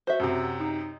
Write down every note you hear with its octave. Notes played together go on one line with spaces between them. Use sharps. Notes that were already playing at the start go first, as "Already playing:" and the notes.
F#4 C5 E5
F#2 C3
D#4